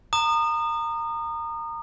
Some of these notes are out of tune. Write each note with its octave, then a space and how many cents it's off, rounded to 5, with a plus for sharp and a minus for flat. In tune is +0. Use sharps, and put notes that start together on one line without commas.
A#5 -20 D#6 -30